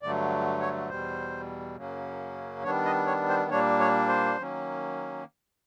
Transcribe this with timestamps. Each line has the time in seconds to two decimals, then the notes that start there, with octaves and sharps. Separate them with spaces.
0.02 G2 D3 F#3 A3 D5
0.61 C#5
0.89 E2 B2 G3 C5
1.76 F#2 C#3 F#3 A#3 C#4
2.64 D#3 G3 B3 D4 C#5
2.85 D#5
3.07 C#5
3.29 C5
3.50 A#2 G3 A#3 D4 C#5
3.80 C#5
4.08 C5
4.38 D#3 F#3 A#3 C#4